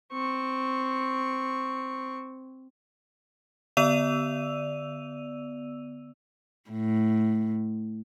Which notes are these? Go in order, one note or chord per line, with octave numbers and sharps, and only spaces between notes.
C4 C#6
D3 B3 D5 E6 D#7 F7
A2